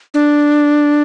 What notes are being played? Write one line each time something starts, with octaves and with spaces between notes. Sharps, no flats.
D4